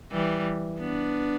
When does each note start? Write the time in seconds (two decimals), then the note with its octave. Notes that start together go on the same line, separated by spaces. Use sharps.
0.12 E3 G3
0.79 B3 D4